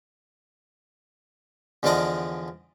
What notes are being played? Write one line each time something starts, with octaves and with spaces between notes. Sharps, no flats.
E2 D3 F3 D4 D5 D#5